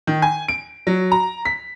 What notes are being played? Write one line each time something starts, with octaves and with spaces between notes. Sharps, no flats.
D#3
G#5
D7
F#3
A#5
B6